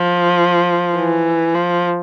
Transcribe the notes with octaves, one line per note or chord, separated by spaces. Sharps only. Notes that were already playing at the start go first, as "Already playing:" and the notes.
Already playing: F3
E3
F3